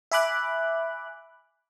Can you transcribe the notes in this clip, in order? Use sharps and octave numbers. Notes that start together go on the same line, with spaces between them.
E5 G#5 B5 D6 F#6